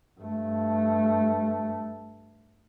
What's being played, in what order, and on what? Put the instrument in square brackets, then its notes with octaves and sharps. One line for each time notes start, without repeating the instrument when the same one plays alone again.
[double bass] G2 A3